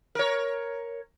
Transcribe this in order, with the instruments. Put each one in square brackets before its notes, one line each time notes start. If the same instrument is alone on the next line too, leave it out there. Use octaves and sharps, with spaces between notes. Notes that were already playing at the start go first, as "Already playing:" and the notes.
[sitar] A#4 C#5